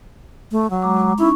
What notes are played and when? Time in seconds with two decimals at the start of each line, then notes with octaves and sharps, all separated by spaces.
0.51 A3
0.70 F#3
0.82 G#3 A#5 D6
1.18 C#4 D#4 E4 C#6